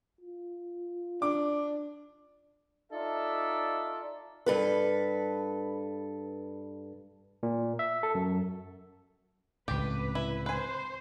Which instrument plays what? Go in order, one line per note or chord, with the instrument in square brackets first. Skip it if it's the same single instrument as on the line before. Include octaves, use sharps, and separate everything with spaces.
[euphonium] F4
[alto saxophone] D4 [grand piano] D6
[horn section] D#4 F4 A4 D5 E5
[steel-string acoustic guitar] G2 A4 B4
[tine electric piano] A#2
E5
A4
F#2
[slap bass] C#2 A2 [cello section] C3 B4 [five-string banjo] G4
[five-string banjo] E4
[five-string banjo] B4 G#5 [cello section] C5